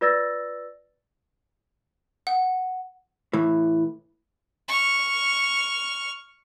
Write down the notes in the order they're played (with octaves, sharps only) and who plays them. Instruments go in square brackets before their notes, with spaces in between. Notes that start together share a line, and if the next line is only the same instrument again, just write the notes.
[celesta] F4 B4 D5 E6 A6 A#6
[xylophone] F#5
[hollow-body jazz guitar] A2 E3
[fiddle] C#6 F6